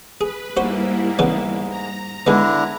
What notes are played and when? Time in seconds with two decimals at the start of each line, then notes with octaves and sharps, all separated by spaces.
0.21 G#4 B4
0.57 G#2 G3 A#3 E4 F#4 C5
1.19 C#3 E3 B3
1.70 A#5
2.27 D3 D#3 G#3 B3 D4 E4